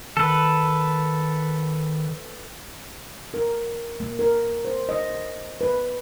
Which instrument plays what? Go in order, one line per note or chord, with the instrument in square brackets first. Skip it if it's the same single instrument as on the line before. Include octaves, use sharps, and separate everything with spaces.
[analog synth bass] D#3 [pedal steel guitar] A4 B4
[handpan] A#4
A#3
A#4
C5
D#5
B4